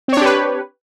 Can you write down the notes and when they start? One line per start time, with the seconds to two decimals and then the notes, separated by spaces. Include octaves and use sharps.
0.08 C4
0.13 C#5
0.17 D4
0.21 G4
0.26 B4